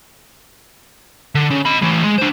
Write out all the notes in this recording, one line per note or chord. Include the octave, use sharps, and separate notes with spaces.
D3
C#3
D#5 B5
A2 E3
G#3
D4 C5